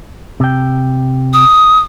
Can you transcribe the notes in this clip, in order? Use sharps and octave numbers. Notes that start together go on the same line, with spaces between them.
C3 G5
D#6